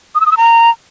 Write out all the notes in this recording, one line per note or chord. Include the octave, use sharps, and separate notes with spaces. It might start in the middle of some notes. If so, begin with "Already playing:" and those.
D#6
E6
D#6
E6
A#5